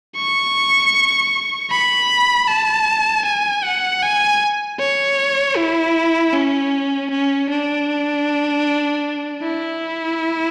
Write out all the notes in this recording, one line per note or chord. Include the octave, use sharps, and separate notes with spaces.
C#6
B5
A5
G#5
F#5
G#5
C#5
E4
C#4
C#4
D4
E4